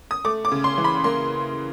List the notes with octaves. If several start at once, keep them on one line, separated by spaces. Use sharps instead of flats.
D#6
A3 D6
D6
C#3
C6
E3
B5
A#3 C6